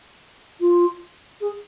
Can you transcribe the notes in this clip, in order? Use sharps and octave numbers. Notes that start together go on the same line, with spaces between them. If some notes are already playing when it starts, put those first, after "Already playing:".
F4
G#4